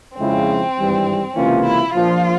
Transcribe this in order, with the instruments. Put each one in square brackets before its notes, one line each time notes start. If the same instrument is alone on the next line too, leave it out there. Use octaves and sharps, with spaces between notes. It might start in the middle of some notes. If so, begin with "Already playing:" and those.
[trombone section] F2 C#3 F3 G#3 E4 [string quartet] C4
[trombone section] G#1 G2 E3 G3
[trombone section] C#2 C3 E3 A#3 F4 [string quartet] C#4
[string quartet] E4
[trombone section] A#1 A#2 F3 [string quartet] F4